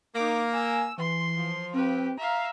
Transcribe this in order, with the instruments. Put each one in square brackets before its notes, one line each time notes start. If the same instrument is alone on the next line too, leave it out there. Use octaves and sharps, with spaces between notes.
[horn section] A#3 [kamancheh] D#4 D6
[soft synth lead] G#5 [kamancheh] E6
[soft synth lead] E3 [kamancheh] C6
[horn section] F3
[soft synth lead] C4 [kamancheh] G4 B4
[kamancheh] E5 F5 [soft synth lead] A#5